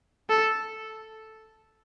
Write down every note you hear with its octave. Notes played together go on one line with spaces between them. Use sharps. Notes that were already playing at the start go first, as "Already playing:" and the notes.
A4